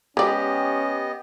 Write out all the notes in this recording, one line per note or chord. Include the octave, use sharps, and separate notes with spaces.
G#3 B3 C#4 G4 D5 D#5